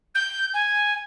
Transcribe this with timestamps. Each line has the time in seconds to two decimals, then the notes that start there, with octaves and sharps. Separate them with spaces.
0.15 G6
0.53 G#5